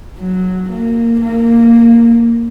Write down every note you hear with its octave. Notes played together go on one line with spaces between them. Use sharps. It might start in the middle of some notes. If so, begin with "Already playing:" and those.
F#3
A#3
A#3